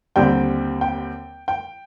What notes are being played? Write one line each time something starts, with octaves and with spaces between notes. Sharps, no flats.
D#2 D3 G3 C4 G5
G5
G5